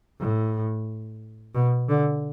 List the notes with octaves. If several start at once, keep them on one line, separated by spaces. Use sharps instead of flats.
A2
B2
D3